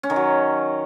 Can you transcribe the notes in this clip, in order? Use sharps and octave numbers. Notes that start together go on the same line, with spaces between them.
C#4
D#3
F#3